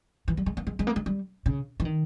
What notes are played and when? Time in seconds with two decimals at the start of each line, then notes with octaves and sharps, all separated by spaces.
0.28 E3
0.37 G3
0.46 G#3
0.57 A#3
0.67 G#3
0.79 G#3
0.87 A#3
0.96 G#3
1.06 G3
1.46 C#3
1.80 E3
1.85 D#3